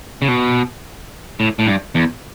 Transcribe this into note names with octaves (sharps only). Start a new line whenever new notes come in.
C#3
B2
A2
A2
G2
E2